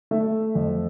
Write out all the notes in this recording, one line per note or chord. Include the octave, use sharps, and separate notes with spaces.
A3 E5
F2